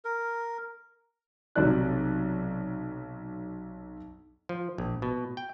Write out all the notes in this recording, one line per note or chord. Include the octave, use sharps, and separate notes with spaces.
A#4
B1 C3 F#3 D5 F#6
F3
A#1
B2
G5